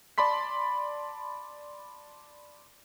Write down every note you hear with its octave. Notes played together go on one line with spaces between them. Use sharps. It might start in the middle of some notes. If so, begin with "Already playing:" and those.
D5 A5 B5 C6 B6